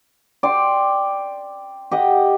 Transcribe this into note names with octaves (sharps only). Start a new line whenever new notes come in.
D5 G5 C6
G4 D#5 F#5